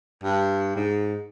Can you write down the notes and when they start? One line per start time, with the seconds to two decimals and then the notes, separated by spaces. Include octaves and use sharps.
0.23 G2
0.76 G#2